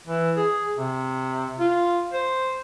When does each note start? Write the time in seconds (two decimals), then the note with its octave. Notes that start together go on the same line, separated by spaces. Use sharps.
0.07 E3
0.37 G#4
0.78 C3
1.59 F4
2.13 C5